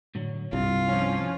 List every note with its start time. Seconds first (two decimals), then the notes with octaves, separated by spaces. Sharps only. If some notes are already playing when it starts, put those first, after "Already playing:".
0.15 A2 D3 F#3
0.53 C2 G2 F4
0.88 F3 C#4